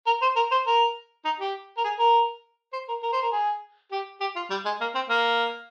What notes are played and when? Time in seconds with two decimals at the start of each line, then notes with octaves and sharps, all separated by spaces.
0.06 A#4
0.22 C5
0.36 A#4
0.51 C5
0.66 A#4
1.25 D#4
1.40 G4
1.77 A#4
1.84 G#4
1.99 A#4
2.73 C5
2.88 A#4
3.03 A#4
3.12 C5
3.22 A#4
3.32 G#4
3.92 G4
4.21 G4
4.36 F4
4.50 G3
4.65 G#3
4.81 A#3
4.95 C4
5.10 A#3